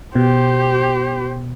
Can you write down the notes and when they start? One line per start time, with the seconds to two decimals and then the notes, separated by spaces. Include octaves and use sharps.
0.15 B2 G4 C5